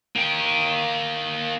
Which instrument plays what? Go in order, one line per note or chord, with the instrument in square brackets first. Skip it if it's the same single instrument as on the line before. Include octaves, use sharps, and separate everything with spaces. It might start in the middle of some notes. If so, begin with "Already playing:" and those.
[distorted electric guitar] A#3 G5